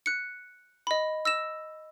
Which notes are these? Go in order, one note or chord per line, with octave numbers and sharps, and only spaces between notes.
F#6 C#7
D#5 B5
E6 A#6 E7